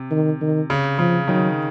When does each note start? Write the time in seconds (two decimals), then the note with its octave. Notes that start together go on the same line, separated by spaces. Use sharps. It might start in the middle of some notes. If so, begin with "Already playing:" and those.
Already playing: C3
0.11 D#3
0.41 D#3
0.70 C#3
0.98 C#3 F3
1.28 D#3 F#3